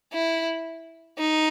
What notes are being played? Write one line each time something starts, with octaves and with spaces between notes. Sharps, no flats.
E4
D#4